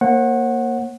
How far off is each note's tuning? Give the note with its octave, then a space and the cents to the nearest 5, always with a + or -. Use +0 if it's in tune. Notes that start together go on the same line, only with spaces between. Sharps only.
A#3 +0 C#5 -45 F#5 +0